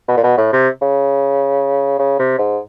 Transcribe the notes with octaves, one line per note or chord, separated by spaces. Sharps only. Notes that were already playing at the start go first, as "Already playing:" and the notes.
B2
A#2
B2
A2
C3
C#3
C#3
C3
G#2